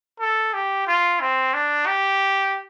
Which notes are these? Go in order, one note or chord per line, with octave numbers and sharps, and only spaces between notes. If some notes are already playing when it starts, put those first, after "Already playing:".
A4
G4
F4
C4
D4
G4